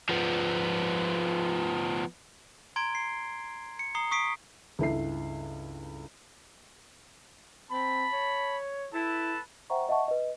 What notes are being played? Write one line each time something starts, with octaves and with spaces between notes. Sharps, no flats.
F3 B3
A#5 C6 G#6 D7 G7
C7
C#7
A#5 D#6 C7 G7
C#6 D#6 B6 C7 D7
C#2 G2 E4 A4 E5 C7
C4 A5 B5
C#5
E4 A4 B4 A5
C5 E5 F#5 G5 A#5 C#6
D#5 E5 F#5 A5 C#6
B4 D#5